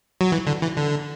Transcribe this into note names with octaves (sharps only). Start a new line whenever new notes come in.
F#3
E3
D3
E3
D3